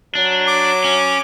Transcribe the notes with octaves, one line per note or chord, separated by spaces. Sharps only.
F#3 D4
D6
C#4